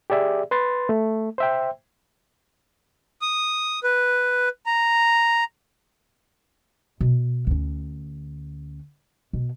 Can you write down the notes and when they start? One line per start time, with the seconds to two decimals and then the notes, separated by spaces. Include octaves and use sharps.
0.10 G4 G#4 D5 E5
0.51 B4 C6 A6
0.89 A3
1.38 C5 E5 G5
3.22 D#6
3.84 B4
4.66 A#5
7.01 B2
7.47 D2 C#4
9.33 B2